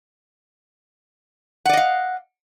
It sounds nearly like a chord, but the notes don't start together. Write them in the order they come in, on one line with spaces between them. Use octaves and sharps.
F#5 D5 D#5 F5